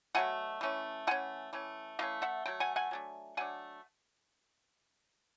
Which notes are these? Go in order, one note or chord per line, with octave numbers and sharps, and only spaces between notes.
B2 F#3 A3 F#5 G#5
E3 A3 C#4
E3 A3 C#4 F#5 G#5
E3 A3 C#4
E3 A3 C#4 D#5 F5
E5 F#5
F#3 A3 G5
F#5 G#5
F#5 G#5
F#3 A3 D4
F#3 A3 D4 F#5 G#5